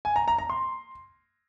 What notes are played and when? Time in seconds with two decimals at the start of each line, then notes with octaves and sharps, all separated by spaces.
0.05 G#5
0.16 A#5
0.28 A#5
0.38 A#5
0.50 C6